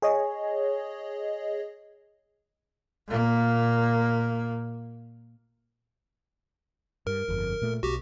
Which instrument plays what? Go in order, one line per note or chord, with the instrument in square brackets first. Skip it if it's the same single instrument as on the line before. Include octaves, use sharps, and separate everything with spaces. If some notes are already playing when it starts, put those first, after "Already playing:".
[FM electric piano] G#4 C#5 D#5
[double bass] A#2 A#3
[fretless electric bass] G2 [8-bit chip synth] A#4
[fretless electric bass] G1 F2
A#2 A3
[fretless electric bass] B1 [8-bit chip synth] F#4 G4